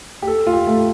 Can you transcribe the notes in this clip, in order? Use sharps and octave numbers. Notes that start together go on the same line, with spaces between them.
G4
A4
F4
G4
A3